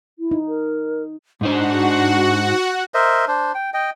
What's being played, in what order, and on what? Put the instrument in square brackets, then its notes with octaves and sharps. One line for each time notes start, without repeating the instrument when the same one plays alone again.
[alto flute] E4
[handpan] D#4
[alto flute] A#4
[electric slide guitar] G#2 D#4 C5 [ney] D4 [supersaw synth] F#4 F#5
[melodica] A#4 C5 D#5 E5
D4 C5
G5
D#5 G5